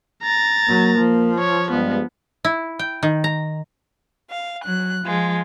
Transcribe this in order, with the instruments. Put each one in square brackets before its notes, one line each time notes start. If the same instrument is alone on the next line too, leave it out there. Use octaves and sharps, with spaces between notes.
[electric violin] A#5 A6
[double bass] F#3 [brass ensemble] A#3
[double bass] F3
[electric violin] C#5
[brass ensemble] G2 G#3 [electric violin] B3
[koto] E4
G5
D#3
A#5
[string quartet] F5
F#3 F#6
F3 G#3 F4